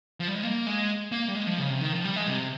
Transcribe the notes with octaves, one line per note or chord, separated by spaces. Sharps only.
F3
G3
G#3
A#3
G#3
A#3
G3
G#3
F3
C#3
C3
D#3
F3
G3
G#3
C3